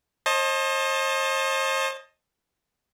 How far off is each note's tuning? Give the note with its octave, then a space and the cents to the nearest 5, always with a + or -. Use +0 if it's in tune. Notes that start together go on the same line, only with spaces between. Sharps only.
C5 +40 D#5 +0 A5 +0